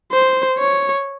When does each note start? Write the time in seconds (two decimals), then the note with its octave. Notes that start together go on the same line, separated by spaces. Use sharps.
0.12 C5
0.59 C#5